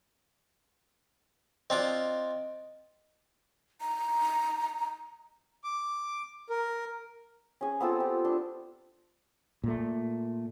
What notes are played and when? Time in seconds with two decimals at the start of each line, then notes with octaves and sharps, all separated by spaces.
1.70 C4 D4 F4 D#5
3.81 A#5
5.64 D6
6.50 A#4
7.61 C#4 G#4
7.81 B3 C4 F4 A4
8.00 G4
8.25 D4
9.64 A#2 A3